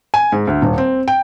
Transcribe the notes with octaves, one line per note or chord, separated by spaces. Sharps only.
G#5
G#2
D2
D#1
C4
G5